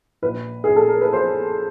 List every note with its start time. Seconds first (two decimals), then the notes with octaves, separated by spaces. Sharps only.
0.22 A#1 B4
0.64 A#1 G#4
0.76 A4
0.88 A#4
1.01 B4
1.13 F3 C5